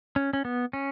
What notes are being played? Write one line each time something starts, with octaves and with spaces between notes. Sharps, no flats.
C#4
C#4
B3
C#4